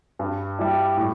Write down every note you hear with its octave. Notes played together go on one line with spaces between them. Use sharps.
G2
G3 E4
A2